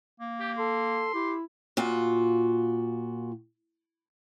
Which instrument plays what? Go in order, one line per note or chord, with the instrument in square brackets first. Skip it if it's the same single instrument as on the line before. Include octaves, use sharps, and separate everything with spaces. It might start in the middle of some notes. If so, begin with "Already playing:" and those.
[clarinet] A#3
[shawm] G4
[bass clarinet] A4 [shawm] C6
[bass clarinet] E4 [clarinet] G4
[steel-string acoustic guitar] A#2 F4 F#4